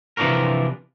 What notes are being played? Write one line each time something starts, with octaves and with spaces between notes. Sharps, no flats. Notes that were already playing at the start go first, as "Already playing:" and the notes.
C3 E3 F3 D4 F#4 A#4